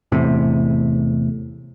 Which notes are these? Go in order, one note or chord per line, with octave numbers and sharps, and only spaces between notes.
E2 A2 C3